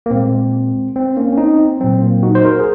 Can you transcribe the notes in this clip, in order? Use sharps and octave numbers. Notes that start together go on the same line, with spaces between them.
A#3
A#2 G#3 C4
C4
A#3 C#4
C#4
C4 D#4
C4
A#2 F#3 C4
A#3
D#4 F#4
C5
F#4 A#4
G#4